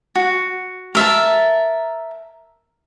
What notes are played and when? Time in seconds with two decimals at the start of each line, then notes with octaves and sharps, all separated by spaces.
0.15 F#4
0.95 A#4 E5 A5